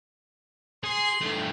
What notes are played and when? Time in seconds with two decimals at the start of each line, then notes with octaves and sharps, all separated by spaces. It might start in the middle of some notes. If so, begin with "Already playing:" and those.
0.83 G#4 C6
1.21 G2 A3